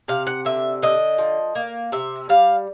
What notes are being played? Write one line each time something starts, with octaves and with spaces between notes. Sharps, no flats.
C3 F5
F#5
D3 E5
D3 D#5
F3
A#3
C3 E5
G3 F5